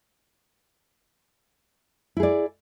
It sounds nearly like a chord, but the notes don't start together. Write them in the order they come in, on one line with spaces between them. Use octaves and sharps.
E4 G#4 D5